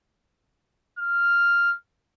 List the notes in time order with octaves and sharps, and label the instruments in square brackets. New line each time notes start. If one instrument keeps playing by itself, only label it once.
[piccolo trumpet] F6